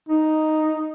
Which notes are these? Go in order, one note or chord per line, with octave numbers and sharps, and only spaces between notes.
D#4